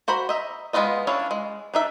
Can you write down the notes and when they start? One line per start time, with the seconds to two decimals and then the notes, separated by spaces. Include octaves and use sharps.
0.08 F#4 C5 A#5 B5
0.29 D#5 E5 A#5
0.73 G#3 B3 D4 F4 D#5
1.07 C#4 D4 E4 C#5 F5
1.31 G#3
1.74 D4 D#4 E5